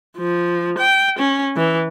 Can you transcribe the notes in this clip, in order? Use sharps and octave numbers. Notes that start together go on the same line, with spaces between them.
F3
G5
C#4
E3